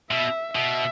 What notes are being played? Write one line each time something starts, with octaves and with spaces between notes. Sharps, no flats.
B2 E5
B2 E5